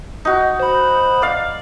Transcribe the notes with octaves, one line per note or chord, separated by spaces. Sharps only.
D#4 F#4
C5 B5
D5 F5